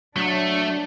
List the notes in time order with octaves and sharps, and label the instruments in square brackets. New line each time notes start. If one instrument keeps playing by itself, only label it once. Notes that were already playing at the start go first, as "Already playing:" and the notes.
[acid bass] F#3 [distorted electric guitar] A3 [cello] D4